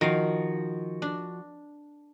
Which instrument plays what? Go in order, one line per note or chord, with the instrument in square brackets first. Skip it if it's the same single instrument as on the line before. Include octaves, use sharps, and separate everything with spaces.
[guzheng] D#3 F5 [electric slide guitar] F3 F#4
[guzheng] D4